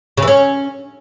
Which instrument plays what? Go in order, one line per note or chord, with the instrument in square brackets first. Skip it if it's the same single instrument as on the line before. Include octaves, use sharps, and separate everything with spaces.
[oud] C#3
E3
C#4